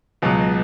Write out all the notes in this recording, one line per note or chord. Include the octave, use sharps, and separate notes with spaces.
C#2 B2 F#3